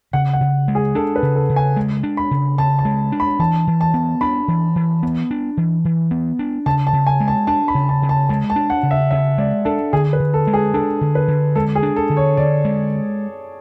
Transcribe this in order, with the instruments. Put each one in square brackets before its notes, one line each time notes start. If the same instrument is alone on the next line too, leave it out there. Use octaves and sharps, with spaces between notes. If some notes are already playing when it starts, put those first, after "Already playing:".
[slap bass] C#3 [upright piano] F#5
[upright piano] F#5
[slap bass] C#3
G#3
[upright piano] G#4
[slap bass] D4 [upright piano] A4
[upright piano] B4
[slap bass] C#3
[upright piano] A4
[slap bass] C#3
[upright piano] G#5
[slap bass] G#3
D4
[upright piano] B5
[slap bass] C#3
[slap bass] C#3 [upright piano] A5
[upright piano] A5
[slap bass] G#3
D4
[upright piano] B5
[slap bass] E3 [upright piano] A5
[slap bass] E3
[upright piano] A5
[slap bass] B3
[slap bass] D4 [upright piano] B5
[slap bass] E3
E3
B3
D4
E3
E3
B3
D4
[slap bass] C#3 [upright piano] A5
[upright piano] A5
[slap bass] C#3
[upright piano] G#5
[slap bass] G#3
[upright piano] A5
[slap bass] D4 [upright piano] A5
[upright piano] B5
[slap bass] C#3
[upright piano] A5
[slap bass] C#3
[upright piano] A5
[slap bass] G#3 [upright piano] A5
[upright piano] A5
[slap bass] D4
[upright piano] F#5
[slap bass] C#3
[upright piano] E5
[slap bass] C#3 [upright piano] E5
[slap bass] G#3 [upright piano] D5
[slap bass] D4 [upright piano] A4
[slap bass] D3 [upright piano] G#4
[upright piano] B4
[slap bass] D3
[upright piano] A4
[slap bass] G#3
[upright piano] G#4
[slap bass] D4 [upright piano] A4
[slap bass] D3
[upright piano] B4
[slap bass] D3
[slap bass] G#3 [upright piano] A4
[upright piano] G#4
[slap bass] D4
[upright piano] A4
[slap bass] D3
[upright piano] C#5
[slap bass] D3 [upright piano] D5
[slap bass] G#3